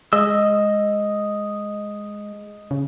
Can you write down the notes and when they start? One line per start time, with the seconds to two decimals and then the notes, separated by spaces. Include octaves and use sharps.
0.13 G#3 D#5 E6
2.71 C#3